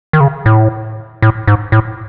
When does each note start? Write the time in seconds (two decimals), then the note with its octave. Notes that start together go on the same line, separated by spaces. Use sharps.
0.13 D#3
0.20 C#3
0.46 A2
1.22 A2
1.47 G#2
1.72 A2